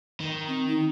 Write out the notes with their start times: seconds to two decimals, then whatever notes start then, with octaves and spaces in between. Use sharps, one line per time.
0.20 D#3
0.48 C4
0.67 D#4